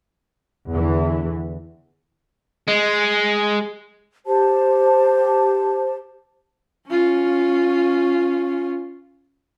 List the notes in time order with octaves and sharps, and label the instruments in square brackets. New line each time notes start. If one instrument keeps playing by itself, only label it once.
[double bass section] E2 D3 E3
[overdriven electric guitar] G#3
[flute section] G4 C5 A5
[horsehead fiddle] C#4 F4